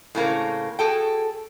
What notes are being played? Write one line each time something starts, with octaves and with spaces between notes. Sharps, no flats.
A2 C#3 A#3 C4
F#4 G#4 A4 G5